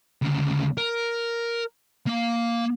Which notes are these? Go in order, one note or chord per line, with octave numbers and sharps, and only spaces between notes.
D2 C#3
A#4
A#3 F5